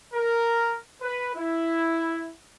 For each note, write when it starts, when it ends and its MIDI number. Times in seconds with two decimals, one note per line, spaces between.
0.14 0.74 70
1.01 1.29 71
1.35 2.29 64